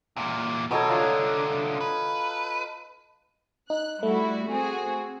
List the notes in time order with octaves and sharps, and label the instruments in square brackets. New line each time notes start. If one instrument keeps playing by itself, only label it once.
[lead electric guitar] E2 A#2
[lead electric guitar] B2 [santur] F#3 D#4 C#5 [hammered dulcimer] A4 D#5 A#5
[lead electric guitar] C2 D3 [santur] F4
[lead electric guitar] B4
[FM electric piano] D#4 [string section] F#6
[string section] G3 E4 F#4 [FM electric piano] A3
[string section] C4 F#4 G#4